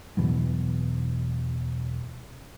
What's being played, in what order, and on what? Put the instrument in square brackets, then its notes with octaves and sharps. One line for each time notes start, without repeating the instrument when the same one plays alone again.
[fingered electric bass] E2 B2 E3 F#3